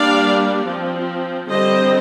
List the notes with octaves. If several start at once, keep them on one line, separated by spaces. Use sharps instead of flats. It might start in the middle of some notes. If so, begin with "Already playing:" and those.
Already playing: G3 A#3 D4 D5 F5
F3 C4
D3 G3 C4 C5 D#5